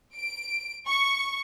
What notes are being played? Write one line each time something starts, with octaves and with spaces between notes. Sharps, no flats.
D7
C#6